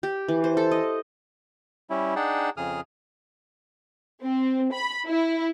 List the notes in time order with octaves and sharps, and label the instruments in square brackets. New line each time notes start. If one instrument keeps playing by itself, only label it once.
[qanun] G4
E3
C5
A4
D#5
[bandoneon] G3 C#4 E4
D4 D#4 G#4 F#5 G5 A5
F2 C#3 G#4 D#6 F6
[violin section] C4
B5
E4